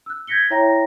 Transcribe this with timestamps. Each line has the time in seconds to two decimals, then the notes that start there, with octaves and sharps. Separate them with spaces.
0.06 E6 F#6
0.27 G6 G#6 A#6 B6 C#7 G7
0.50 E4 C#5 E5 G5 A#5 A#6